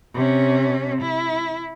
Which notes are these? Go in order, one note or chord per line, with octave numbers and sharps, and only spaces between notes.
C3 C#4
E4